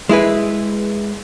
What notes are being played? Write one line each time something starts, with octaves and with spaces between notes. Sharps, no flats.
G#3 E4 G#4 B4